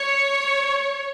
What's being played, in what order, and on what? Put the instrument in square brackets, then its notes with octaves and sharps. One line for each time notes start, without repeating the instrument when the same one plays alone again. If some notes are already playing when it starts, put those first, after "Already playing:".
Already playing: [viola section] C#5